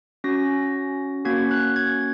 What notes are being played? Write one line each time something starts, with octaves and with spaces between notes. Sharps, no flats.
C#4 F#4 A#6
A#3 C#4 F#4 G#6
F#6
G#6